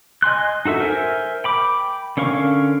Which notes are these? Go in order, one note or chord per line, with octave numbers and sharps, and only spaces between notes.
D#5 G#5 C6 F#6
D#4 F#4 A4 E5
A#4 C5 E5 G#5
G5 B5 D6
D3 C#4 A#4 F5 C#6